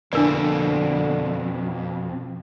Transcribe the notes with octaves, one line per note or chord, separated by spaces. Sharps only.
F2 B2 D3 A#3 D4 A#4 D5